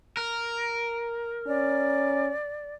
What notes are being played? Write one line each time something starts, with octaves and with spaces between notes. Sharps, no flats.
A#4
C#4 D5